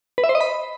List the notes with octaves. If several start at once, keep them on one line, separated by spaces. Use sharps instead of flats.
B4
E5
C5
D#5
B5